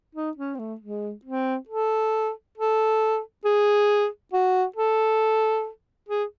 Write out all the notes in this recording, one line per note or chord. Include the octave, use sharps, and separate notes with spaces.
D#4
C#4
C4
A3
G#3
C4
A4
A4
G#4
F#4
A4
G#4